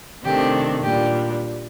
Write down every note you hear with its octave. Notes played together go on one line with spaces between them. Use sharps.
C3 D#3 A3 D4 G4
A#2 G3 D4 G4